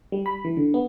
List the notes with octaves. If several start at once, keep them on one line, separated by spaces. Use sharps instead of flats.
G3
B5
E3
D3
B3